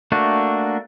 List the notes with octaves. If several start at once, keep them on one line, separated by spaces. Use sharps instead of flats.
A3 A#3 D4 F#4